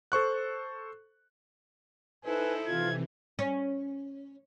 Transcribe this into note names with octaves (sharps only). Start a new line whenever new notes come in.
A4 C5 C#6 F#6
D#4 E4 A4 B4 C5 G#5
C3 E3 F4 G#6
C#4